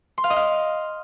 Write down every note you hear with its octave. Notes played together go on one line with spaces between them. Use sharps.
C6
F5
D#5
F5